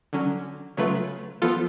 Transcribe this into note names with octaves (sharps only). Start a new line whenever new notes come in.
D3 F#3 C#4
C#3 F#3 A3 F4 B4
F3 B3 F4 A4